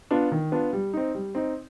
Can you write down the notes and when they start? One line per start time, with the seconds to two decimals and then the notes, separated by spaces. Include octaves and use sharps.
0.11 B3 D4 F4
0.32 D#3
0.52 B3 D4 F4
0.73 G3
0.93 C4 D#4
1.15 G3
1.35 C4 D#4